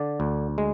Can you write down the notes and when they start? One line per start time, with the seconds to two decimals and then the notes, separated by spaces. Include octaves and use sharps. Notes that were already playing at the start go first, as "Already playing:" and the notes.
Already playing: D3 D5
0.20 D2
0.58 G#3